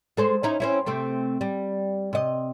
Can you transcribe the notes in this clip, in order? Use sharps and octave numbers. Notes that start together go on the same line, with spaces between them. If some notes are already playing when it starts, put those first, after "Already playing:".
G#3 A4 C5
C#4 D#4 E4
C4 C#4 E4
C3 A3 C4
G3
C3 D#5